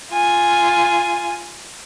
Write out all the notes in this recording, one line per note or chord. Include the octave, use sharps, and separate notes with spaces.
F4 G#5